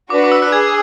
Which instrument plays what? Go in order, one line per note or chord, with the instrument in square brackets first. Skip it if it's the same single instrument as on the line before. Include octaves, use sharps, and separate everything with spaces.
[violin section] D4 F#4 B4 [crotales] D6
[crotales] D6
E6
F#6
[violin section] G#4 [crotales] G#6